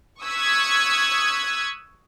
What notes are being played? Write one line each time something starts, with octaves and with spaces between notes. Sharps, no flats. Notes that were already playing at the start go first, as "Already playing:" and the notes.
C#6 D#6 E6 F#6 G#6 B6